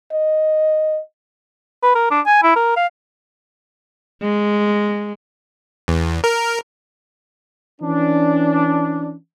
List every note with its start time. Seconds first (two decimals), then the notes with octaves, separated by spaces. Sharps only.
0.12 D#5
1.83 B4
1.95 A#4
2.11 D4
2.26 G#5
2.43 E4
2.56 A#4
2.76 F5
4.22 G#3
5.88 E2
6.24 A#4
7.81 E3 C#4 D4